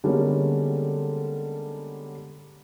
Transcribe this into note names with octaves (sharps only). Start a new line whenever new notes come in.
D3 G3 G#3 A#3 B3 C#4